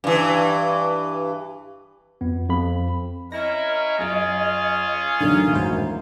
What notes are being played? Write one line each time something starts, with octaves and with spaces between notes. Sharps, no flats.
G2 E3
F2 B3
F2 B5
C#4 E4 A#4 D#5 A#6
F#2 C#4 F4 G#4 D7
A1 F#2 D3 D#3 F#3 A#3
A1 D#2 G#3 E4 F#4 C5